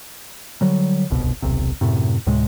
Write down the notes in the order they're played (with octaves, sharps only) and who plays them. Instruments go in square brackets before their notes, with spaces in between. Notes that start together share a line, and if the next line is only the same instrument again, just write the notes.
[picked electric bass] D3 F#3 G3
D1 G1 C2 B2
D#1 B1 C3
F#2 A2 C3
D2 A2 C3 G#3